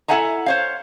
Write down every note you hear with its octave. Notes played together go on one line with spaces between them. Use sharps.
E4 A4 E5 F#5 G#5 A#5
C5 C#5 F5